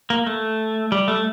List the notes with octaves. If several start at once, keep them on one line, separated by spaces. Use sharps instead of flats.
A#3
A3
G3
A3